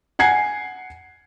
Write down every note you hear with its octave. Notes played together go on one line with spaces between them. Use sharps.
F#5 G#5 G#6 C7